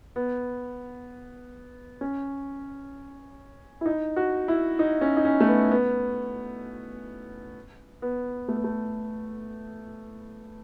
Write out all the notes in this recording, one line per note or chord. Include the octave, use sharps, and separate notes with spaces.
B3
C#4
E4
D#4
F#4
E4
D#4
C#4
D#4
C#4
A3
B3
B3
B3
A3
B3
A3